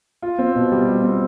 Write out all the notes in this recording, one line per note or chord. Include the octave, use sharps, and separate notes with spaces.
F4
C4
B2
G3
F4
C4